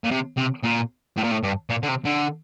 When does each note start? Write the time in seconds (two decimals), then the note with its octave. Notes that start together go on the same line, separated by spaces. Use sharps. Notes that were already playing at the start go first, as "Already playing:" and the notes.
0.04 A#2
0.11 C3
0.37 C3
0.64 A#2
1.17 A2
1.24 A#2
1.32 A2
1.43 G2
1.70 A#2
1.83 D3
1.88 C3
2.05 D3